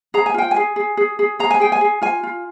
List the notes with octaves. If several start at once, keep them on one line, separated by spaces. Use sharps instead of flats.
G#4 A#5
G#5
F4 G5
G#5
G#4
G#4
G#4
G#4
G#4 A#5
G#5
G#4 G5
G#5
G#4
F4 G#5
F4